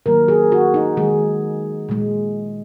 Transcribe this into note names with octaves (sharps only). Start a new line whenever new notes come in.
D#3 F#3 A#3 A#4
G#4
F#4
D#4
D#3 G#3 G#4
A#2 G#3